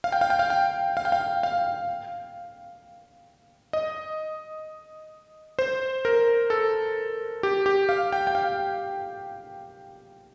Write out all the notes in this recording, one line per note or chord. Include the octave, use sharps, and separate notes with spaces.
F5
G5
F5
G5
F5
G5
F5
G5
F5
F5
D#5
C5
A#4
A4
G4
G4
F5
G5
G5
F5